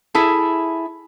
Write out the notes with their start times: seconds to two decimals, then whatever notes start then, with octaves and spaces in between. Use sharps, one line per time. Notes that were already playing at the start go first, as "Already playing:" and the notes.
0.15 E4 G#4 A4